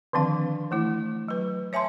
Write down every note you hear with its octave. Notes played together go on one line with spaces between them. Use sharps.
D3 D#3 F3 C4 D4 F5
E3 A3 E4
F#3 B4
C#5 E5 G#5 A5 C6